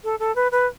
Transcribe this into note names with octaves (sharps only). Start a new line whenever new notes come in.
A4
A4
B4
B4